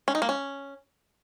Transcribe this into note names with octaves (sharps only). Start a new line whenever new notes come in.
C#4
D#4
A#3
C#4